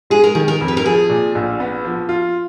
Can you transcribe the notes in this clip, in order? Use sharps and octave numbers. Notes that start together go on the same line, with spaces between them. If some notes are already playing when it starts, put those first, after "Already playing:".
G#3 G#4
A#4
D#3 G#4
A#4
F2
B4
A#4
F3 G#4
A#2
A#1
B3
F3
F4